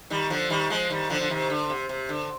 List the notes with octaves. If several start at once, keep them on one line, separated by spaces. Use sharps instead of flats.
D#3 G3
D3 F3
D#3 G3
F3 G#3
D#3 G3
D3 F3
D3
C3 D#3
D3
C3
C3
D3